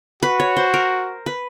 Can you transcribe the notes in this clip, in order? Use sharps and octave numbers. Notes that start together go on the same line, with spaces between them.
F#4 B4
C#5
C5
A#4
B4